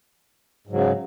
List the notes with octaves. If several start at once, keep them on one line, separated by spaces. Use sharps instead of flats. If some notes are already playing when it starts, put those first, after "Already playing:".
G#2 C#3 F#3